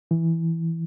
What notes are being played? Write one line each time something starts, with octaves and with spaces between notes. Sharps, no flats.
E3